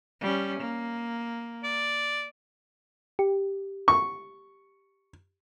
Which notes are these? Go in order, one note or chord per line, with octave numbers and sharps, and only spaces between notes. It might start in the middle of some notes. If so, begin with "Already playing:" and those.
G3 C#4
A#3
D5
G4
C#6